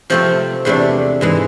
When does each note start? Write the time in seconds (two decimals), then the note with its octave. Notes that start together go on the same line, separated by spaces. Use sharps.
0.10 C3 F3 A3 C4
0.65 E2 C3 E3 A3 D4
1.21 G#2 E3 G#3